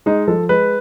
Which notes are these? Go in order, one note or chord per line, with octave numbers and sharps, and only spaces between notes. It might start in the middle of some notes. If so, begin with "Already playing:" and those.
G#3 D#4
F3 A4
G#3 B4